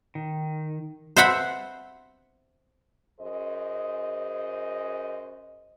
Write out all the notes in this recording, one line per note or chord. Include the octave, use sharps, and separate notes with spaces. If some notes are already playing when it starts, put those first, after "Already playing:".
D#3
C5 E5 F#5 B5
F#2 G#4 C5 D#5